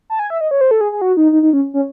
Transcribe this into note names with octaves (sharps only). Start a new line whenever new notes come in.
A5
G#5
E5
D#5
C#5
C5
A4
G#4
G#4
F#4
D#4
D#4
D#4
C#4
C#4